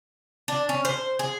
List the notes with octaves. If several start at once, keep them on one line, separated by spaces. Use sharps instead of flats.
D4
C#4
C5
G#4